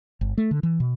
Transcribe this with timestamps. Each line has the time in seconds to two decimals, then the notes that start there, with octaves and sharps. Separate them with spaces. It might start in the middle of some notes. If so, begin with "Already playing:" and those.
0.21 G1
0.38 A3
0.51 D3
0.63 E3
0.80 B2